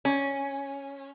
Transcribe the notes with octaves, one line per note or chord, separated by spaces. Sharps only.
C#4